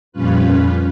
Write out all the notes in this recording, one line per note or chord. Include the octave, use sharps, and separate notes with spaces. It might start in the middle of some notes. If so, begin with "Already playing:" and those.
F2 A#2 G3 C#4 F4 B4